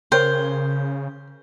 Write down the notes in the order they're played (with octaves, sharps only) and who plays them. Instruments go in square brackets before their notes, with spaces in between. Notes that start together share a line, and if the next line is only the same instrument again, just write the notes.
[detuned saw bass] C#3 [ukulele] A#4 C#5 G5 [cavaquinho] C5